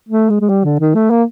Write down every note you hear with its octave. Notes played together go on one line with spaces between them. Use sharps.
A3
G#3
G#3
G3
D3
D#3
A3
A#3